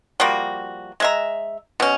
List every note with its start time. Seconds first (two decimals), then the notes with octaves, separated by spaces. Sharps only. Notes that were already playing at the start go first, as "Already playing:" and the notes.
0.20 F3 G3 A#3 F#4
1.00 G#3 E5 A#5
1.80 B2 C#4